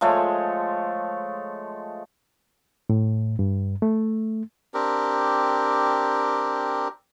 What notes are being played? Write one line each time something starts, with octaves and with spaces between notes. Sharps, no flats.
F3 G#3 A3 C#5
A2
G2
A3
C4 D4 G4 A#4